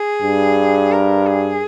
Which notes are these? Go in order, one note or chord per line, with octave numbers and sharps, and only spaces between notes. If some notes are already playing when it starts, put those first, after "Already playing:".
Already playing: G#4
G2
A#4
G#4